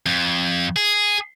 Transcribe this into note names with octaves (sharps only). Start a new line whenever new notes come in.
F2
G#4